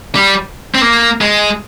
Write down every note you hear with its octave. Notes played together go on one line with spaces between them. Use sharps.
G3
C4
A#3
G#3